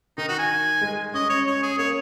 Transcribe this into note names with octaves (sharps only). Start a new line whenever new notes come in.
D#3 D#4
F#4
G#5
G#3
C#4 D#5
C#5
C#5
G#4
A#3 C#5